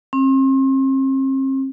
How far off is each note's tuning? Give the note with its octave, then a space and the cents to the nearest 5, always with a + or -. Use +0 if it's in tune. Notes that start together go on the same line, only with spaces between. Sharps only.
C4 +40